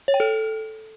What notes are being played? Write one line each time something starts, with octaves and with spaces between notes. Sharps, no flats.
C#5
G5
A4